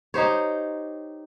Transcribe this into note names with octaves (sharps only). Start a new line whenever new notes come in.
D#4 G4 C5 C#5